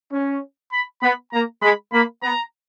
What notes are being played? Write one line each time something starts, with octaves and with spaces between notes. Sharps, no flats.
C#4
B5
B3 B5
A#3 A#5
G#3 B5
A#3 B5
B3 A#5